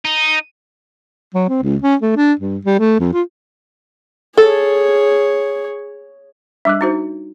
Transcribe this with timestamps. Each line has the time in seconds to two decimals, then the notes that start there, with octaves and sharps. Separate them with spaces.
0.05 D#4
1.34 F#3
1.49 C4
1.62 C#2
1.82 C#4
2.02 A3
2.16 D4
2.39 G2
2.65 G3
2.79 A3
2.99 F2
3.13 F4
4.37 G#4 A4 C#5
6.65 G3 D4 E5 D6 F#6
6.81 D#4 F#4 C5